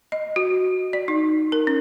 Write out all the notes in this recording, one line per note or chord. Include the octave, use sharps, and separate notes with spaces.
D#5
F#4
D5
D#4
A#4
C#4